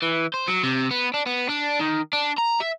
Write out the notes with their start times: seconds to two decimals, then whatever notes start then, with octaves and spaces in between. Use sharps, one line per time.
0.03 E3
0.34 C5
0.48 F#3
0.63 C3
0.91 B3
1.14 D4
1.26 B3
1.49 D4
1.79 D#3
2.13 D4
2.38 A#5
2.61 E5